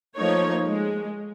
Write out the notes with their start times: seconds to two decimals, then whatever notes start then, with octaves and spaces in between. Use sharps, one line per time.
0.16 F3 A3 A#3 D#4 C#5
0.66 G#3